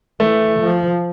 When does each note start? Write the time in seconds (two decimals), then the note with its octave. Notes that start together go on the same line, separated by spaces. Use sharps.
0.20 E3 A3
0.60 F3